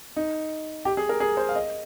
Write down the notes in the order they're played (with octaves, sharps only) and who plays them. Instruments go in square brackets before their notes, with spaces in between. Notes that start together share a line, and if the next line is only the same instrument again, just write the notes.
[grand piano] D#4
G4
G#4
A#4
G#4
C5
F5
D#5